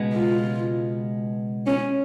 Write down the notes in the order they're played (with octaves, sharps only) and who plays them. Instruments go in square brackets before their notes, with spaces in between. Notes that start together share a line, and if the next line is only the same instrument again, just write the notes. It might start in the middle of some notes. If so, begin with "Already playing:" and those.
Already playing: [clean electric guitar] C#2 B2 G#3 B3
[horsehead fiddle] F4
C#4